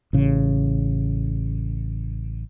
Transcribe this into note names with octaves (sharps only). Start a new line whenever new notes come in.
A1 C#3